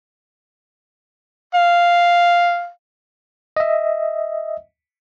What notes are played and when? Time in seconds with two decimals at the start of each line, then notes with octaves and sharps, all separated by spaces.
1.55 F5
3.57 D#5 E5